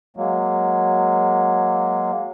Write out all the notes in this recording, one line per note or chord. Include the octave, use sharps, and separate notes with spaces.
F#3 G#3 A#3